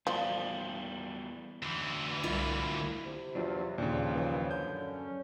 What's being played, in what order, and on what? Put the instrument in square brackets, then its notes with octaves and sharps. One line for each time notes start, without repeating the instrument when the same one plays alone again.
[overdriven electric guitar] E2 G3 [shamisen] F3
[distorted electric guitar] D2 E3
[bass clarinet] C2 [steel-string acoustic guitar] E4 F4
[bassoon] C3
[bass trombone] E2 [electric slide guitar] F#3 D4 F4
[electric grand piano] D#2 C#3 [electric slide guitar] A#2 [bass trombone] F3 [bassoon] D4
[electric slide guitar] F#2 C#5 [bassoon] E3
[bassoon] D3 [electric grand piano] G6
[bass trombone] C#4